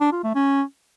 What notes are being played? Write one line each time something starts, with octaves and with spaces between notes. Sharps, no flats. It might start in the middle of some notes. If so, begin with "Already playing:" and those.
D4
F4
A3
C#4